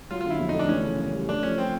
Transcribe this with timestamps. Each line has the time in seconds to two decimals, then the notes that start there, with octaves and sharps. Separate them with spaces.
0.11 F#3 F4
0.21 D3 F4
0.30 E4
0.39 F2
0.49 D#4
0.54 A3
0.59 D4
0.69 E3 C#4
0.83 C#3
0.98 F#2
1.13 G3
1.28 A3 D4
1.43 F3 C#4
1.58 C4